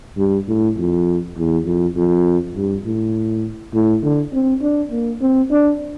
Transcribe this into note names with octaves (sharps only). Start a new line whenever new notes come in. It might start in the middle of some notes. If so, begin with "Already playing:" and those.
G2
A2
F2
E2
F2
F2
G2
A2
A2
D3
C4
D4
A#3
C4
D4